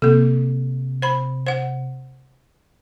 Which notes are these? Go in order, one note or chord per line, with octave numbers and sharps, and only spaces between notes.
C3 A#3 A4
C5 B5
C5 F#5